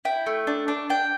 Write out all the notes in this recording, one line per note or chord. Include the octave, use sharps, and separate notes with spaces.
E4 G5
A3
D4
D4
D4 G5